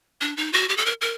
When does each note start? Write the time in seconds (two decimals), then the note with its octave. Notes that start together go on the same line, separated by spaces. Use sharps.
0.21 D4
0.37 D#4
0.53 F#4
0.69 G4
0.77 A4
0.86 A#4
1.01 A#4